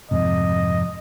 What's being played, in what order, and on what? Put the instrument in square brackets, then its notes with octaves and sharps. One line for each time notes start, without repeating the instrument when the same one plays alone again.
[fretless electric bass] F2 G#2 C3 [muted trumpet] D#5